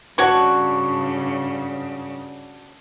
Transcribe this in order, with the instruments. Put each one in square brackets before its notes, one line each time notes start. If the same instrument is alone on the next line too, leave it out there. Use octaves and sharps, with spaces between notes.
[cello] G2 C#3 [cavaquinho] F#4 C#5 C#6 [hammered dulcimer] D5 A5